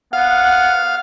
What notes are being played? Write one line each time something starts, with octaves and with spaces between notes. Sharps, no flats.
B3 F5 F#5